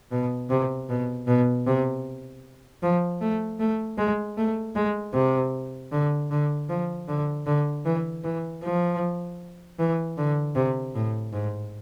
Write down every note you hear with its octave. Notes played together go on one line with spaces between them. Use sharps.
B2
C3
B2
B2
C3
F3
A3
A3
G#3
A3
G#3
C3
D3
D3
F3
D3
D3
E3
E3
F3
E3
D3
C3
A2
G#2